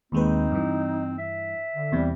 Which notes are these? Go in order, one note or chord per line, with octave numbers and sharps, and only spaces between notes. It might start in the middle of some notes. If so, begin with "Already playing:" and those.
D#2 G#3 C4 D#4 B4
G2 E3
E5
D3
E2 C3 G3